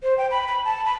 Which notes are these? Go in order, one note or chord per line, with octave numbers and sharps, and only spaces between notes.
C5
G5
B5
B5
A5
B5